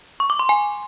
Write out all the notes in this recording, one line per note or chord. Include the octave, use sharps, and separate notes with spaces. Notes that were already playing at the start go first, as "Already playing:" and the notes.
C#6
D6
C6
G#5